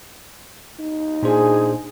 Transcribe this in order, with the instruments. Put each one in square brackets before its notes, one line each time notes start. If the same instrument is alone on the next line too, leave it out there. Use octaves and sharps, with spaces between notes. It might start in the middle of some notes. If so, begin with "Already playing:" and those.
[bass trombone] D#4
[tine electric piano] A#2 D4 C5 [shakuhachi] G#4